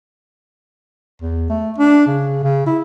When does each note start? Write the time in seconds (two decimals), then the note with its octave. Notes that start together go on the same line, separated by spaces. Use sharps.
1.22 E2
1.50 A3
1.78 D4
2.07 C#3
2.43 C#3
2.66 E4